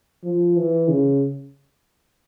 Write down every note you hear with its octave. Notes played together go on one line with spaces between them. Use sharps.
F3
E3
C#3